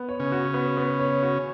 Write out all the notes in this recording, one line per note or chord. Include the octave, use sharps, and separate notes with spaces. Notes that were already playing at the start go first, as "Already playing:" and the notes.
Already playing: B3
C#5
C#3 C#4
F#4
B3
B3
C#5
F#4